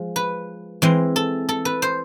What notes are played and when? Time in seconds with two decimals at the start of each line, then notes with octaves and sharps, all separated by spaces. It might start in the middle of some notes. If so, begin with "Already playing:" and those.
Already playing: F3 G#3
0.16 B4
0.82 E3 G#3 C4
1.16 A4
1.49 A4
1.65 B4
1.82 C5